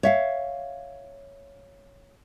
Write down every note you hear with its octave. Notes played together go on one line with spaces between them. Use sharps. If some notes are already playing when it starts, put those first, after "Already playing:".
C#5 E5 F5